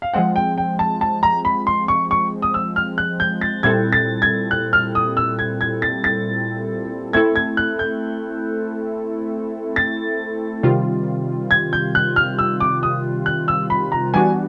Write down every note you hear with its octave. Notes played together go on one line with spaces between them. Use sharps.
F5
F3 G#3 C4 F#5
G5
G5
A5
A5
A#5
B5
C6
C#6
C#6
D#6
E6
F6
F#6
G6
A6
A#2 G3 C4 E4 A4 G#6
A6
G#6
F#6
F6
D#6
E6
G#6
G#6
A6
A6
A3 C4 E4 A4 G#6
G#6
F#6
G6
A6
C3 D#3 G3 C4 F4
G#6
G6
F#6
F6
E6
D6
D#6
F#6
E6
B5
A#5
E3 G3 B3 D4 F#4 G#5